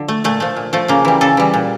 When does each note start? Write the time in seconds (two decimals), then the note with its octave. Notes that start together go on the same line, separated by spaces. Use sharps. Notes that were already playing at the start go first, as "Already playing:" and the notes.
Already playing: D3 F3
0.08 A3
0.24 A#2 A3
0.40 F3 A3
0.57 A#2
0.73 F3 A3
0.88 C#3 A#3
1.05 E3 G3
1.21 C#3 A4
1.37 E3 G3
1.54 A#2